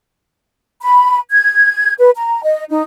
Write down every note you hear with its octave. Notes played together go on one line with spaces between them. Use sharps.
B5
G#6
B4
A#5
D#5
D#4